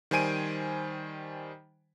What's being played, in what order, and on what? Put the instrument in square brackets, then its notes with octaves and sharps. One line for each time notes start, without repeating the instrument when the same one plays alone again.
[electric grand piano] D#3 G3 C5 G#5 D7 D#7